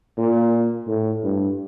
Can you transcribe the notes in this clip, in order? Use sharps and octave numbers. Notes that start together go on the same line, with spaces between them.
A#2
A2
G2